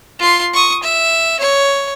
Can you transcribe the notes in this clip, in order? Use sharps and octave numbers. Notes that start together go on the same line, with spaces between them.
F4 C6
C#6 D#6
E5
C#5